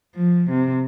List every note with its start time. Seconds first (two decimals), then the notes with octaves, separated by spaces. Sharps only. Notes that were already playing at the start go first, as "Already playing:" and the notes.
0.15 F3
0.50 C3